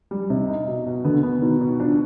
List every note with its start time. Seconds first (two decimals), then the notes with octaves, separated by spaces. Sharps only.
0.11 G3
0.30 C3 D#4
0.49 D#4
0.68 B2
0.86 B2
1.04 D3 B3
1.23 B3
1.42 B2 D#3
1.61 B2
1.80 F3 D4